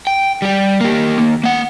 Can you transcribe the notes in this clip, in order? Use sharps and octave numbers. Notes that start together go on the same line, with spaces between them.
G5
G3 G4
A#3 G4
D#2 A#3
A#3 F#5